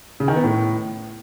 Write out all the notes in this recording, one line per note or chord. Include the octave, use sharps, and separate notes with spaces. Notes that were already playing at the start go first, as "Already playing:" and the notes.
C#3
D#3
B3
A2